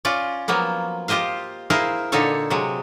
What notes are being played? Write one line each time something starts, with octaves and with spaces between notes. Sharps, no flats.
C#4 F4 D5
F3 F#3 A#3 B3
F4 G4 C5 D#5 F5
E4 G#4 A#4 C5 F5
A#2 D3 D#4 A4 C#5
C3 F#3 G#3